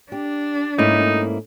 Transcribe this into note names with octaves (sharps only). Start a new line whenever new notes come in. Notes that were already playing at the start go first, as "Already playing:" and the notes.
D4 G4
G#2 A3 A#3 C#4 D#4 E4